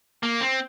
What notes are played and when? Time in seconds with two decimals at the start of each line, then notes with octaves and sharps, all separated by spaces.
0.23 A#3
0.40 C4